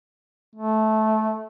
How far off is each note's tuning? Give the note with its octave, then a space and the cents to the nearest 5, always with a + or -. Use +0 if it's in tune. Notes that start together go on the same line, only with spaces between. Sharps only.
A3 -15